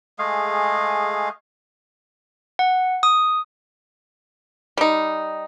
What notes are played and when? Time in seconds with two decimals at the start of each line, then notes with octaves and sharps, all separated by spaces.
0.19 G#3 A3 G#4 F5
2.59 F#5
3.03 D#6
4.77 G3 D#4